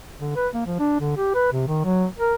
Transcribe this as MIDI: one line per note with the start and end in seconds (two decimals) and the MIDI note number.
0.20 0.33 50
0.36 0.48 71
0.54 0.64 58
0.66 0.76 53
0.79 0.98 62
1.00 1.13 50
1.16 1.30 67
1.34 1.51 71
1.52 1.65 48
1.68 1.83 51
1.84 2.05 54
2.18 2.35 70